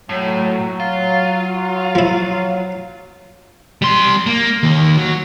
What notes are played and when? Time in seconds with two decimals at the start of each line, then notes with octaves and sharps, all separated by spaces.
0.09 A2 F#3
0.80 F4
1.95 F3 E4
3.82 G3 C6
4.26 A#3
4.63 D#2 D#3
4.97 F#3